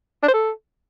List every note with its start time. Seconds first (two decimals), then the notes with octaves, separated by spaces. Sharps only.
0.23 D4
0.28 C5
0.34 A4